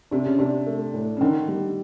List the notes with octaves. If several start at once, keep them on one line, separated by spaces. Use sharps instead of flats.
C3 D4
C#3
C3 D4
A3
A2
C#3
D3 D#3
G3